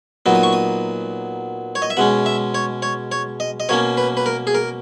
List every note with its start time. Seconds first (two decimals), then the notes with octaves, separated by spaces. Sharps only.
0.26 A#2 F#3 B3 D#4
0.35 D#6
0.43 C#6
0.53 D#6
1.75 C#5
1.82 D#5
1.90 E5
1.97 B2 G#3 C#4 F#5
2.26 E5
2.55 C#5
2.82 C#5
3.12 C#5
3.40 D#5
3.60 D#5
3.69 B2 A#3 C#4 C#5
3.97 B4
4.17 B4
4.26 A#4
4.47 G#4
4.55 A#4